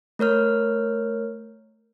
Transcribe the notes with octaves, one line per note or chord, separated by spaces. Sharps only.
A3 A#4 C#5 F6